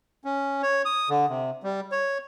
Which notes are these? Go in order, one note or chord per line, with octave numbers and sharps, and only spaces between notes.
C#4
C#5
D#6
D3
C3
G3
C#5